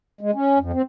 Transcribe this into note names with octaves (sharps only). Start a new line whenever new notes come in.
G#3
C#4
F2
C4